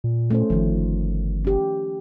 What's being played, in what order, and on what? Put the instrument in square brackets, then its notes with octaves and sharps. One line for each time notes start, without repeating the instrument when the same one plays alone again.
[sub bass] A#2
[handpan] A3 C#4 C5
[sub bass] G1 [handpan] D#3 F3
[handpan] C#4 G4